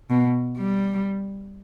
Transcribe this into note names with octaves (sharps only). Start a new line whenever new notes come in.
B2
G3